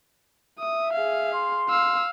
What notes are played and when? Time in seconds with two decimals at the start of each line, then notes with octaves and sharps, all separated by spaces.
0.59 E5 D#6
0.93 G#4 F5
1.33 C6
1.69 F5 E6